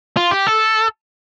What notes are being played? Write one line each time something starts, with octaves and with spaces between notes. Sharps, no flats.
F4
G4
A4